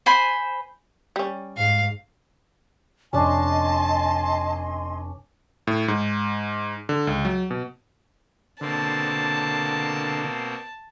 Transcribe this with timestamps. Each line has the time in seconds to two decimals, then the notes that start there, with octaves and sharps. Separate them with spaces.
0.06 C5 G#5 B5
1.16 G3 C#4
1.57 G#2 F5
3.13 F1 C#4 D4 D#5 G#5 A5 C6
5.67 A2
5.88 G#2
6.89 D3
7.07 C#2
7.25 F#3
7.51 B2
8.61 B2 D3 A#3 C4 A5